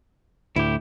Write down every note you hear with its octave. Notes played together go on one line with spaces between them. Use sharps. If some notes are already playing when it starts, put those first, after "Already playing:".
D2 A2 E4 G4